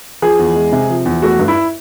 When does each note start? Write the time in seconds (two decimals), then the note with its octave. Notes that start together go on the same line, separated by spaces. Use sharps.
0.22 F3 G#4
0.39 E2
0.55 G#3
0.72 C3
0.90 F3
1.05 E2
1.22 A3 F#4
1.39 G2
1.48 E4